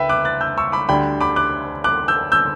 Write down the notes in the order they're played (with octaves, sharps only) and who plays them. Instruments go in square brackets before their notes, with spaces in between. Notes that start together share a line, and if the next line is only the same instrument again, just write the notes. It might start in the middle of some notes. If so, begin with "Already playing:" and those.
Already playing: [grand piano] C#2 B4 E5 G5
D6 F#6
F#6 A6
E6 G6
C#6 E6
B5 D6
D2 D3 G3 G5 B5
B5 D6
D6 F#6
D6 F#6
E6 G6
E6 G6